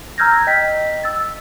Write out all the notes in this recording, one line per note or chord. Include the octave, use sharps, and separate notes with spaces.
A#5 E6 F6 G6 G#6 A#6
D#5 G5 B6
E6 A6